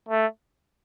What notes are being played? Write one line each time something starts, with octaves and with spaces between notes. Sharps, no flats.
A3